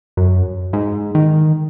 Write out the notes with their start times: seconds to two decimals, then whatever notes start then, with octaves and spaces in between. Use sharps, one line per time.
0.17 F#2
0.73 G#2
1.15 D#3